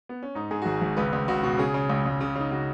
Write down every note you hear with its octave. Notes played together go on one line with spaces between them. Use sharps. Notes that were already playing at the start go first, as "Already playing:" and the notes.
B3
C#4
G#2 D#4
G#2 G#4
F#4
G#1 G#4
G#1
C#2 B4
C#2
C#2 F#4
B2
C#3 G#4
C#3
C#2
C#2
C#3
C#3 D#4
C#3 F#4